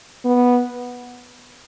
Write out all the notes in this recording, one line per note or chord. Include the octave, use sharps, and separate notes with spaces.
B3